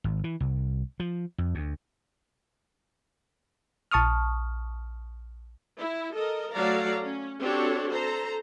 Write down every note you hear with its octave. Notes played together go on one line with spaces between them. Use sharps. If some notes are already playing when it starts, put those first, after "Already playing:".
G#1
E3
C2
F3
F2
D2
A#1 A5 C#6 D#6 F6
E4
A4 A#4 D#5
F#3 A3 A4 D5 F5 A#5
C#4
C4 D4 F#4 G4 A4 C#5
A4 C5 A#5